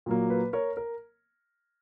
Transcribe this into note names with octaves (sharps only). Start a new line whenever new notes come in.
A#2 F#3 A#3
B4
A#4 C#5
A#4